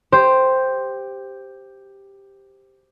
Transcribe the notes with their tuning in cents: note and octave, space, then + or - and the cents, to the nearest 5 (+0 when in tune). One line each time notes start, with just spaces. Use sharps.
G4 +5 C5 +0